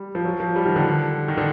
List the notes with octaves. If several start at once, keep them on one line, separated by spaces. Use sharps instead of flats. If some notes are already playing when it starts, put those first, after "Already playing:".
Already playing: G3
F3
F#3
F3
G3
D#3
D3
D#3
D3